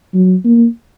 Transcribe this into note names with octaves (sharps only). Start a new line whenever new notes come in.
F#3
A#3